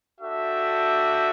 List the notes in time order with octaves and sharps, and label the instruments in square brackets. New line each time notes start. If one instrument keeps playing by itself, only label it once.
[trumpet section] D4 F#4 A4 E5 G5